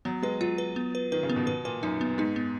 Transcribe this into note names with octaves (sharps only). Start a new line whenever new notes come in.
F#3 B3
G#3 B4
F#3 F4
B4
B3
B4
D#3 B4
C#3
B3
B2
B2 B4
A#2 B4
F#2 D#4
B3
G#2 D#4
B3